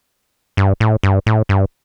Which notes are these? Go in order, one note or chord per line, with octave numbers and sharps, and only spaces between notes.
G2
A2
G2
A2
G2